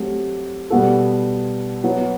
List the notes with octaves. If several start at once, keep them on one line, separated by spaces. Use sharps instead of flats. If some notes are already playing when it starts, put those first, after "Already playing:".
Already playing: F#3 A3 C4 G4
B2 G3 B3 F#4 A4
F#3 B3 F#4